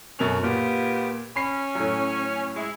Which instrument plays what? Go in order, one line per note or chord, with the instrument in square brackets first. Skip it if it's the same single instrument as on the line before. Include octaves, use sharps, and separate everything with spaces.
[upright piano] F#2 B2 F7 [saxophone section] C#4 A4 A#4
[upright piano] A#2 [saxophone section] B3 F4 G4
[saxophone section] C#4 [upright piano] B5 C7
[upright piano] A2 F#3
[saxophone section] G#3 E4